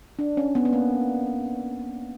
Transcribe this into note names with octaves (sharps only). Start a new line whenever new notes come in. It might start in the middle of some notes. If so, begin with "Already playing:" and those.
D4
C#4
B3
B3
A#3